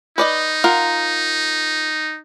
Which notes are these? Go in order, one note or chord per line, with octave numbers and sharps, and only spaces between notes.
D#4 B4 D5 D#5
F4 A#4 F#5